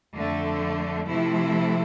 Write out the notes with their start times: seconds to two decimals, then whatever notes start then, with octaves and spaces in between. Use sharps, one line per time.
0.14 F2 D3 A3
1.07 C3 F3 A3 E4